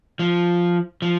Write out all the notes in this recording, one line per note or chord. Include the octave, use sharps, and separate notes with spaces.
F3
F3